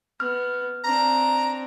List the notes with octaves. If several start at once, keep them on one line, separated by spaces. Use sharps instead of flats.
B3 F6
C4 D4 A#5